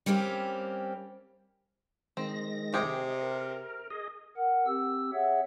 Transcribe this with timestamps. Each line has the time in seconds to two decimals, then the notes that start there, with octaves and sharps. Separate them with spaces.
0.06 G3 A#3 C4 C#4 G4
2.17 D#3 G#3 C4 A#6
2.74 C3 G4 G#4
2.99 D#5
3.22 A#4
3.90 G#4 D#5
4.37 A#4 F#5
4.66 C4 G4 E6
5.13 G#4 C#5 E5 F#5